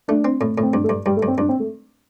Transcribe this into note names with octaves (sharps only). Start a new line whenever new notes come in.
A3 D4
C4
A2
A2
C4
G2 D4
A3
G2
G2 G3
A3
G2
C4
G2 D4
C4
A3